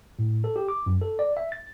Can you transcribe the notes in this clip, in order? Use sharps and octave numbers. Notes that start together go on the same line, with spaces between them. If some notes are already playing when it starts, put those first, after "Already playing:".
A2
A4
G4
D6
F#2
A4
D5
E5
A6